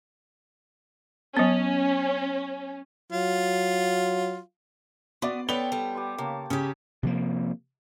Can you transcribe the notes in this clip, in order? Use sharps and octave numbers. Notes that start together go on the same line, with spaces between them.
F#3 B3 C#4
F#3 F4
B3 F#4 D5 C6
B3 A4 B4 C#5 D5 G5 F7 G7
G3 A4
G4 B4 C6
C#3 A#3 A5
C#3 C#4 G4
C3 F3 A#3